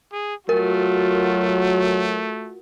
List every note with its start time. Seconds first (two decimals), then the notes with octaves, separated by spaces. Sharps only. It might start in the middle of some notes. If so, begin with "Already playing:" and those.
0.12 G#4
0.49 F#3 A3 F4 F#4 A#4